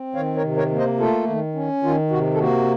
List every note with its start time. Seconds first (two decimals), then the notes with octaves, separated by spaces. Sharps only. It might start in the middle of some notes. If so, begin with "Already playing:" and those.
Already playing: C4
0.15 D#3 C#5 F5
0.36 A#4 C#5
0.43 C3
0.57 A#4 C#5
0.71 A#3
0.78 C5 D#5
0.99 A3 F4 A4
1.27 D#3
1.55 C#4
1.83 D#3 F4
2.10 C3 F#4
2.34 A4
2.39 A#3 F#4